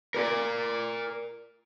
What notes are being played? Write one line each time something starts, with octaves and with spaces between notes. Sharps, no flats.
A#4 D5